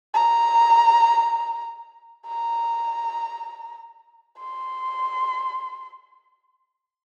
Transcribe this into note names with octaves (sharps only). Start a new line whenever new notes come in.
A#5
A#5
C6